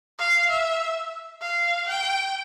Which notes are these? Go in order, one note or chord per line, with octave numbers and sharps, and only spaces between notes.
F5
E5
F5
G5